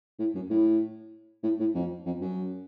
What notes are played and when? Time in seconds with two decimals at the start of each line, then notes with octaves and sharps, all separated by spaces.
0.19 A2
0.35 F#2
0.50 A2
1.43 A2
1.60 A2
1.75 F2
2.06 F2
2.21 F#2